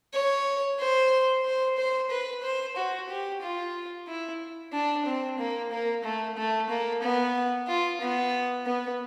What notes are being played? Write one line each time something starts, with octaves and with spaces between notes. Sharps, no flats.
C#5
C5
C5
C5
B4
C5
F#4
G4
F4
E4
D4
C4
A#3
A#3
A3
A3
A#3
B3
F4
B3
B3